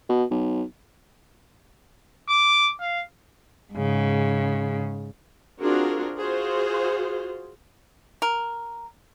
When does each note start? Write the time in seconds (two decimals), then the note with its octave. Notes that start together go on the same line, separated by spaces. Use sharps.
0.09 B2
0.31 B1
2.29 D6
2.80 F5
3.73 G#2 C#3
5.60 C4 D4 F4 F#4 G#4 A#4
6.18 F4 F#4 G#4 C5
8.22 A#4